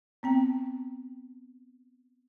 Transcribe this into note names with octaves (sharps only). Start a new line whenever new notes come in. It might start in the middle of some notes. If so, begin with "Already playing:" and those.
B3 C4 G5